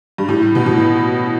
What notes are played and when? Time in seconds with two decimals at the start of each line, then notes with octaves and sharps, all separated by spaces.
0.18 G2
0.29 A2
0.55 B2
0.66 A2